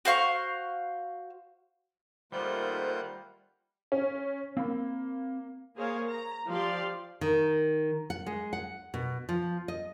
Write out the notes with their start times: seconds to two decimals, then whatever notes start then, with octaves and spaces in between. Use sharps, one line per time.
0.05 F#4 C5 F5 C#6
2.32 D#3 G3 A3 A#3 F4 C5 F#5 G6
3.92 C#4
4.57 A#3 C4 B5
5.76 A#3 G#4 A#4 C5 C#5 F5
6.09 A#5
6.47 F3 G4 D5 F5 C6
7.21 D#3
8.10 F#5
8.26 G#3
8.53 F#5
8.94 B2
9.29 F3
9.68 D#5